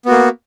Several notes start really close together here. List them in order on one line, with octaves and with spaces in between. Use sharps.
B3 F#4 A#3